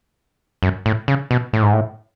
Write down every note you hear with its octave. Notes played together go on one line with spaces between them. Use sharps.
F#2
A2
C#3
B2
A2
G#2
A2